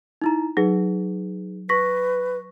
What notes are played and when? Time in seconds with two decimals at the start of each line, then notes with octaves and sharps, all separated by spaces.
0.21 D#4 E4 A#5
0.57 F#3 D#4 G#4 B4
1.69 B4 C#6 A#6 B6